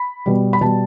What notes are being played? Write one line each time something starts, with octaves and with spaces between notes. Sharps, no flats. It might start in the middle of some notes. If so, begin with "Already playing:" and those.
Already playing: B5
B2 G3
B5
B2 G3 A5